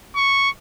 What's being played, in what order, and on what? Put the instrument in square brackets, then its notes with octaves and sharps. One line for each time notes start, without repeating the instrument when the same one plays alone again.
[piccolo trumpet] C#6